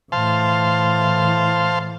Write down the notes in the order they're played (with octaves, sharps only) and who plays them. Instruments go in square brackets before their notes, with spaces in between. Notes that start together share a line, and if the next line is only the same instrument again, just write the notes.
[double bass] A2 E3 [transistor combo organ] C5 F5 A5